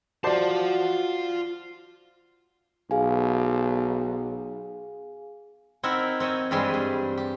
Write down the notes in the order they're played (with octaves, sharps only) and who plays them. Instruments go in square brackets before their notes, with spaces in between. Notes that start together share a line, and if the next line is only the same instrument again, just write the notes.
[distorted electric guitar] F4 A5 [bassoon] F#4 [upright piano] C5 D5 C7
[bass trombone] B1 [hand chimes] G#4 F5 G#5
[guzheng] C4 D#4 E4 A#4 E5 F#5
C4 C#5 D#5 E5
G2 E3 G3 G#3 C4 G#4
G2
G4